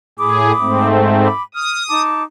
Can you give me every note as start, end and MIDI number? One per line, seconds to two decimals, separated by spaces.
0.19 0.52 45
0.19 0.52 68
0.19 0.88 83
0.19 0.88 86
0.19 0.88 87
0.60 1.28 44
0.60 1.28 57
0.60 1.28 60
1.24 1.42 83
1.24 1.42 86
1.55 2.02 87
1.55 1.83 89
1.88 2.23 63
1.88 2.23 81
1.88 2.23 86